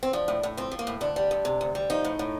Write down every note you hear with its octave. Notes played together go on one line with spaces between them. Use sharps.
C4
F3 D4
A2
A2
F3 C4
F3
A#3
A2
D2 D4
G3
D2
C3
D2
G3
F3 D#4
A2
A2